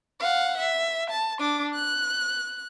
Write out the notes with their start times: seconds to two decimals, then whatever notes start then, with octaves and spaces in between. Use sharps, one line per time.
0.20 F5 F#5
0.57 E5
1.10 A5
1.39 D4 D6
1.74 F#6